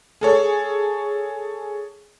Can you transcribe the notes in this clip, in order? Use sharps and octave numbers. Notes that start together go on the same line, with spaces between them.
G#4 A4 C#5